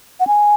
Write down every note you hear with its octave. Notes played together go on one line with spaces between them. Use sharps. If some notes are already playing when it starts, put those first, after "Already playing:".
F#5
G#5